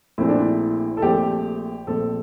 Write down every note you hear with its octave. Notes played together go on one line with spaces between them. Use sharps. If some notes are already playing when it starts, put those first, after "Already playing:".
A#1 A#2 A3 C4 E4
D4
E4
A4
A#1 A#2 A3 C4 G4
A#1 A#2 A3 C4 A4